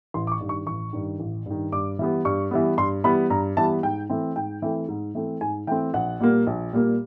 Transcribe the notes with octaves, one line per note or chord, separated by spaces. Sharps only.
A1 C6
D6
C#6
G2 D#3
C#6
A1 C#6
G2 D#3
A1
G2 D#3
G2 D6
E3 G3 B3
G2 C#6
E3 G3 B3
G2 C6
E3 G3 B3 B5
G2 A#5
E3 G3 B3 A5
G#2 G5
E3 A3 C4
G#2 G5
E3 A3 C4
G#2
E3 A3 C4
G#2 G#5
E3 A3 C4 G5
A#1 F#5
A#2 G3 A#3
A#1
A#2 G3 A#3